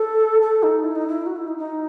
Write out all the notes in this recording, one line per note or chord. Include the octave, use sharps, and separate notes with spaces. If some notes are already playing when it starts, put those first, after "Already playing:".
Already playing: A4
A4
D#4
E4
D#4
E4
F#4
E4
D#4
D#4